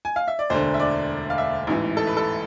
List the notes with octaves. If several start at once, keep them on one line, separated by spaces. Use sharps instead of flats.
G#5
F5
E5
D5
E1 D2 D3 C5
E5
D5
F5
E5
A1 G#2 E3
A4
B4
A4